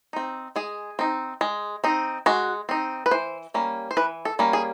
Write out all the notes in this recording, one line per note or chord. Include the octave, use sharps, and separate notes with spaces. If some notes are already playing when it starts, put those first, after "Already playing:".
C4 D#4
G#3 G#4
C4 D#4
G#3
C4 D#4
G#3 F#4
C4 D#4
B4
E3 C5
G3 A#3 C#4
C5
E3 B4
A4
G3 A#3 C#4
G#4